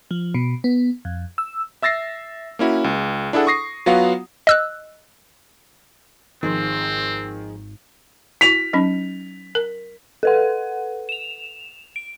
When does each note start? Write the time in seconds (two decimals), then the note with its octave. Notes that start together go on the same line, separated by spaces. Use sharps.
0.11 F3
0.34 B2
0.64 B3
1.05 F2
1.38 E6
1.82 E5 E6 A6 A#6 C7
2.59 A#3 C#4 E4 F#4
2.84 C#2
3.33 D4 E4 G#4 A4 F#5
3.47 C#6 D#6 A#6 C7
3.86 F#3 B3 F4 F#4 F5 F#5
4.47 D#5 E6 F#6
6.43 G#1 D#3 F3 C4 G#4 C5
8.41 E4 F#4 B6 F7
8.73 F#3 C#4 D#4
9.55 A#4
10.23 A4 B4 F#5
11.09 E7 F7
11.96 D7